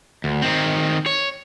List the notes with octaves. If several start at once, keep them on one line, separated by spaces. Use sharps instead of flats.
D2
D#3 C4
C#5